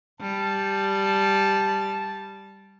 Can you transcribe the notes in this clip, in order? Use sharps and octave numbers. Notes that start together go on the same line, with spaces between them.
G3 A5